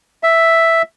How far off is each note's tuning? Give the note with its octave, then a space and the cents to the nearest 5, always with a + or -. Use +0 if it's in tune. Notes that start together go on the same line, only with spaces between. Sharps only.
E5 +0